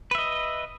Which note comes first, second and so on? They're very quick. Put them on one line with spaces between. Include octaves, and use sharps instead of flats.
B4 E5 D#5